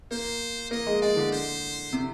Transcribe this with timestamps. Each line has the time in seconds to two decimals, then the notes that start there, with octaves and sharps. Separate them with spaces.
0.11 A#3 C5
0.71 A#3 D#5
0.87 G#3
1.02 G#3 D5
1.16 D3
1.32 C5
1.93 C3